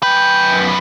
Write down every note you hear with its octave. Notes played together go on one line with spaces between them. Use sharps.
F#2 B4 G5